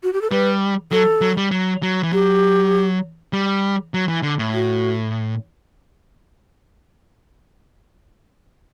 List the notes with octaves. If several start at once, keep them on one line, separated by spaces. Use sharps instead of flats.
F#4
G4
A4
G3 B4
F#3 A4
F#3
G3
F#3
F#3
E3
F#3 G4
G3
F#3
E3
D3
A2
F#4